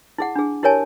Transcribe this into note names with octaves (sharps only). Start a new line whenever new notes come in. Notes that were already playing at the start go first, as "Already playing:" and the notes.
E4 G#4 F#5
D4 G#4
E4 G4 A#4 C#5 G#5 A5